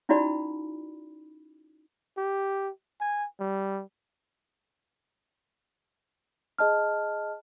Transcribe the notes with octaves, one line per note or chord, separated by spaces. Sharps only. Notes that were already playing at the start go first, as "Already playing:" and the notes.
C#4 D#4 E4 F#4 D5 B5
G4
G#5
G3
G#4 D#5 A5 F6